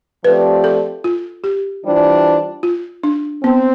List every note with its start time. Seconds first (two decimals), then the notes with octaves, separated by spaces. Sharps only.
0.24 F3 A3 C4 G4 B4 D5
0.64 A4
1.04 F4
1.44 G4
1.84 E3 G3 D4 F4 C5
2.63 F4
3.03 D4
3.43 B3 C4